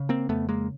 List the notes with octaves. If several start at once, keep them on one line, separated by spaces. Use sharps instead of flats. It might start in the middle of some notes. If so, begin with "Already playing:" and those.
Already playing: C#3
A#3 C4
F2 A3 B3
G#3 A#3